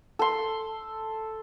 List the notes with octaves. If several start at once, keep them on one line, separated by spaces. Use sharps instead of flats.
A4 C6